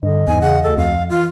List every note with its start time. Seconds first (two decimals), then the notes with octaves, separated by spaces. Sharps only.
0.03 G2 D3 D#5
0.28 E2 G#2 G#5
0.41 C#3 F#5
0.63 D2 A4
0.78 F2 F5
1.10 E3 F4